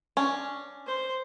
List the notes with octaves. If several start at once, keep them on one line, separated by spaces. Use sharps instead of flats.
C#4 D4
C5